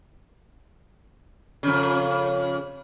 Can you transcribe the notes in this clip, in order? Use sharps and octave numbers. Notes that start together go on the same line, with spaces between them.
F2 C#3